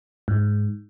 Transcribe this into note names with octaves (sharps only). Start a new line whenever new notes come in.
G#2